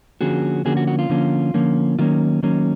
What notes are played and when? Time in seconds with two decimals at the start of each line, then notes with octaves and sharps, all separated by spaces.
0.21 D3 F3 A#3 C#4 F#4 G#4
0.65 D3 F3 A#3 C#4 F#4 G#4
0.77 F#4
0.87 F#4
0.99 F4
1.09 D3 F3 A#3 C#4
1.54 D3 F3 A#3 C#4
1.99 D#3 F#3 A#3 C#4 F4
2.43 D#3 F#3 A#3 C#4